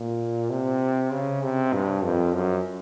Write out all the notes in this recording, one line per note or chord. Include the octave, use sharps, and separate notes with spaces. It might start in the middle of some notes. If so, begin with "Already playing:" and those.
Already playing: A#2
C3
C#3
C3
G2
F2
F#2